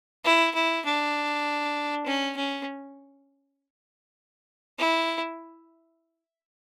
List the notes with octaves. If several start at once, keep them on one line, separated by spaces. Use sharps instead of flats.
E4
E4
D4
C#4
C#4
E4